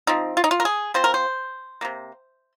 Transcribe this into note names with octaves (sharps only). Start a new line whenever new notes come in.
F3 C4 D#4
F4
D#4
F4
A#4
G#4
F3 C4 C5
A#4
C5
C3 D#3 A#3